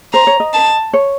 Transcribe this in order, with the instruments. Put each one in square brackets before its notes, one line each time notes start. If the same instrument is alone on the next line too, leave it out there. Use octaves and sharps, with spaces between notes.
[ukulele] C5 [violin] A#5
[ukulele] C#5
D#5
[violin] A5
[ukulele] C#5